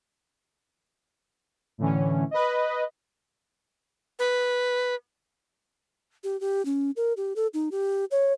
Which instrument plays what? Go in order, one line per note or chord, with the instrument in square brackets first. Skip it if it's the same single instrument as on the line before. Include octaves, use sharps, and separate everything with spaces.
[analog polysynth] A2 D3 E3 C#4
B4 D#5
[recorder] B4
[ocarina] G4
G4
C#4
A#4
G4
A4
D#4
G4
C#5